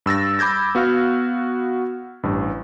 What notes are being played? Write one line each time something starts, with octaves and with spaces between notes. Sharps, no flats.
G2 E6 A6 A#6
B5 D6 G6 G#6 A#6
B3 F#4 F5 F6
A1 G2